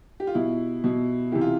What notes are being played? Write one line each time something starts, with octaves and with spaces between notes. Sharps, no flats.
G4
F4
B2 E4
B2
C3 E3 G4
F4